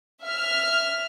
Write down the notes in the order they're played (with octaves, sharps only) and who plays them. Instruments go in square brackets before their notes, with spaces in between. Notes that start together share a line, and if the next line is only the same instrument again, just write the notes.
[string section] E5 F6